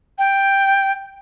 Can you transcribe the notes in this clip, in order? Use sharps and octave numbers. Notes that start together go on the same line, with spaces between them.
G5